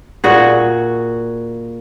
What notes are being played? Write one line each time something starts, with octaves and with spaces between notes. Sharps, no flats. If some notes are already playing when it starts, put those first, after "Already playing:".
A#2 F#4 G#4